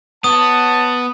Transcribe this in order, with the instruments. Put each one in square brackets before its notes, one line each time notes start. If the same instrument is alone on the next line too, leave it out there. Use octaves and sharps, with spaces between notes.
[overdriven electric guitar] B3 [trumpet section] F#4 C#5 A5 [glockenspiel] D#6